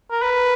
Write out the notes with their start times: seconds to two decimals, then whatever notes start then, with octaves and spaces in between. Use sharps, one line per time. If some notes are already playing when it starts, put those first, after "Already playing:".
0.11 A#4
0.22 B4